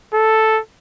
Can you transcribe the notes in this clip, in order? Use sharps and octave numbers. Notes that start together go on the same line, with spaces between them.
A4